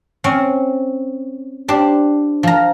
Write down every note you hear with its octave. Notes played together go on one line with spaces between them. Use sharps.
C4 C#4
D4 G4 C5
F3 A#5